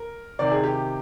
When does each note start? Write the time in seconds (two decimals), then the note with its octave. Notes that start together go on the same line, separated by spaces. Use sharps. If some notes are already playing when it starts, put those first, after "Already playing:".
Already playing: A#4
0.39 C3 D#3 D5
0.51 G#4
0.64 G4